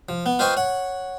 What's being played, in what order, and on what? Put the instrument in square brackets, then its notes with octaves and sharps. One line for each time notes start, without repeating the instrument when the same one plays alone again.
[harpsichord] F3
B3
F4 B4 C5 D#5 G5 C#6
C#5 F#5